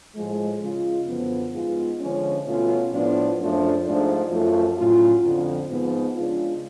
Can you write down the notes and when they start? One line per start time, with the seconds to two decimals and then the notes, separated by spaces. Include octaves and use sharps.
0.16 A2 F3 G#3
0.62 C#3 G#3 C#4 F4
1.07 F#2 D3 F3 B3
1.54 G#2 G#3 B3 F4
2.01 D3 F3 G#3 C#4
2.47 B2 A3 C#4 F4
2.92 A2 F3 B3 D4 F4
3.39 F#2 F3 A3 D4 F4
3.85 G#2 F3 A3 D4
4.30 F#2 F3 A3 F4
4.77 A2 F#3 C#4 F4
5.23 F2 D3 F3
5.70 G#2 F3 B3
6.16 C#3 G#3 D4 F4